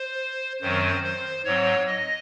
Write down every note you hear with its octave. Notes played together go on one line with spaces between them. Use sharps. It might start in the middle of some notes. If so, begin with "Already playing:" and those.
Already playing: C5
F#2 D#3 F#3 C4 C5
C5
G#2 F#3 C4 C#5
D#5